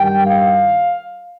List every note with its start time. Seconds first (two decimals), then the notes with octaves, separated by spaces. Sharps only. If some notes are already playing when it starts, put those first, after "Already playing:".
Already playing: G2 D#3 G3 G5
0.26 F5